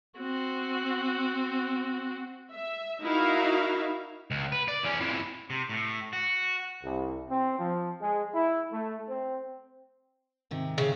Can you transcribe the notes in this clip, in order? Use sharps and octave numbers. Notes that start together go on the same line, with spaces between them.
C4 F#4
E5
D#4 E4 F#4 A#4 E5 F5
C#2
B4
D5
E2 C#4
F2 E3
C3
A2
F#4
C2
C4
F3
G#3
E4
A3
C4
G#2 C3 D#3
C#3